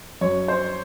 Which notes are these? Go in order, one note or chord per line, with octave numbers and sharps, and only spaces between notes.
F#2 C#5
C5